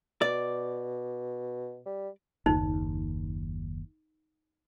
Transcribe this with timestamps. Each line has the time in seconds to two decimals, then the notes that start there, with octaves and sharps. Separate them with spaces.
0.22 B2 D5
1.86 G3
2.46 F#1 D#2 D#4